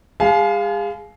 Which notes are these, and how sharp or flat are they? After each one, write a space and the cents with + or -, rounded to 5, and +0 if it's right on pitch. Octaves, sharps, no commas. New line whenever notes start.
G#3 -35 F5 +0 G#5 +40